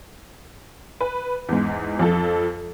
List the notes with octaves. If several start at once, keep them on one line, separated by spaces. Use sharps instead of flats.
B4
E2 G#2
F2 F3 A4